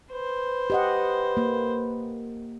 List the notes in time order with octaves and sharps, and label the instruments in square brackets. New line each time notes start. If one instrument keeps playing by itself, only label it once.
[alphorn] B4 [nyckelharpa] C5
[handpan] G4 D#5 F#5
A#3